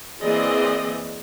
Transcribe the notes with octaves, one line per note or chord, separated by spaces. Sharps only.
E3 A#3 C4 G#4 D5 D#5